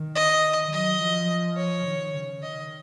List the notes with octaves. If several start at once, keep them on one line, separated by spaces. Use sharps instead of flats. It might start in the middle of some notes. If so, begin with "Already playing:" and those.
Already playing: D#3
D#5
F#3 D#5
F3
C#5
D#3
C#3
D#3 D#5